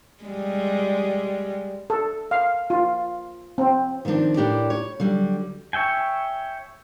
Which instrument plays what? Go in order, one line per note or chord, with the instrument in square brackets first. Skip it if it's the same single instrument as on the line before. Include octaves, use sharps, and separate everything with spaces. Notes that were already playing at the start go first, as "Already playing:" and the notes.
[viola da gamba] G3 G#3
[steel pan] A4
F5
F4
C4
[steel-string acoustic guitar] D#3 F3 A#3 C4 D4
A2 D4 G4 A#4 D5
C#5
D3 F#3 G3
[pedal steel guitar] C#5 E5 G5 G#5